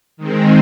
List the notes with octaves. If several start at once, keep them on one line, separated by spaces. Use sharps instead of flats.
D#3 G#3 C4